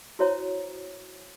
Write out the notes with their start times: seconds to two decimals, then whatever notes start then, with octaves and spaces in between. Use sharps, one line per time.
0.19 E4 F#4 C5 C#5 A#5